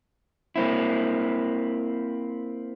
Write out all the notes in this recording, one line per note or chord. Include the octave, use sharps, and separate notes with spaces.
A#3 C4 E4